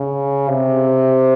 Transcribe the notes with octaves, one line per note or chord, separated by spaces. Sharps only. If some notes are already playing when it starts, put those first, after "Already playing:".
Already playing: C#3
C3